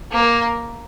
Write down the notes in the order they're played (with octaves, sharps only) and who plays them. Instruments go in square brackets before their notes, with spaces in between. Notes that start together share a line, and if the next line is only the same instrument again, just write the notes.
[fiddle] A#3